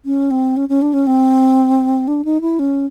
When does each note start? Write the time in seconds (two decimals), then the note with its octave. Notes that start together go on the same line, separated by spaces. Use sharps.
0.05 C#4
0.31 C4
0.57 C#4
0.69 C#4
0.82 D4
0.93 C#4
1.07 C4
2.08 D4
2.25 D#4
2.41 E4
2.59 C#4